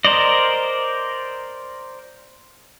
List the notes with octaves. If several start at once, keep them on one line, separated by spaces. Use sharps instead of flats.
A#4 C5 D5 D#5